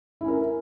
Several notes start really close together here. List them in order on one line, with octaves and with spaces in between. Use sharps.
E4 C#4 A#4